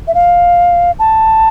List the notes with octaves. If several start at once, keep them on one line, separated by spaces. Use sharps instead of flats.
E5
F5
A5